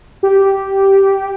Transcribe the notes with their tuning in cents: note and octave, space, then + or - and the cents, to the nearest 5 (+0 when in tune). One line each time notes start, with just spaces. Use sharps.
G4 -10